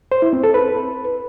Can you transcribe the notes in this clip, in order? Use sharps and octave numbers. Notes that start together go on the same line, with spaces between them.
C5
E4
C4
A4
B4